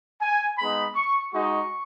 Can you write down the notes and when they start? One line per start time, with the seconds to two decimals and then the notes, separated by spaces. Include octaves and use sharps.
0.21 G#5
0.58 G#3 B3 D#4 B5
0.95 C#6
1.32 G#3 D#4 F#4 C#6